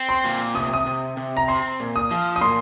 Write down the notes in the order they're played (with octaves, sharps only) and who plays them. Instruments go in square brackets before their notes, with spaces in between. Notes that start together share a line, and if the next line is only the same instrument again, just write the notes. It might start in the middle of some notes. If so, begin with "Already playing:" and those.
Already playing: [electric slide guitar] C4
[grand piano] C6
[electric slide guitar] A#2
[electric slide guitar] C3 [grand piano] D#6
[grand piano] D#6
[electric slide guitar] C3
C3
[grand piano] A#5
[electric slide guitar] C4 [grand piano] C6
[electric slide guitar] A#2
[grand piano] D#6
[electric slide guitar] F3
[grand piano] D#6
[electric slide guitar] A#2 [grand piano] C6